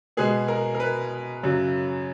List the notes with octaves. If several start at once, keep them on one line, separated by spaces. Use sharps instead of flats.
B2 G#3 B3 G#4
A#4
A#4
B4
F#2 C#3 F#3